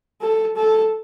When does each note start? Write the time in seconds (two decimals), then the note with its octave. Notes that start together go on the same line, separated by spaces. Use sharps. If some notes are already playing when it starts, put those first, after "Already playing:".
0.22 A4
0.56 A4